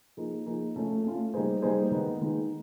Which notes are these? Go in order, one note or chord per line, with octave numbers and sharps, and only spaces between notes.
F3 A#3 D#4 G#4
F3 A#3 D#4 G#4
A3 C#4 F4
A3 C#4 F4
G3 A#3 D#4 G#4 C5
G3 A#3 D#4 G#4 C5
D#3 G#3 B3 D#4
D#3 G#3 B3 D#4